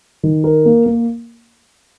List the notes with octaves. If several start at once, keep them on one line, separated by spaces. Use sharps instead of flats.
D#3
A#4
A#3
A#3